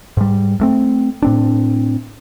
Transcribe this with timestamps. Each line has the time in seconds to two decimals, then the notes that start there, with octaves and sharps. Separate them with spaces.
0.17 G#2 G3
0.60 G2 A3 C4
1.22 A2 C4 D4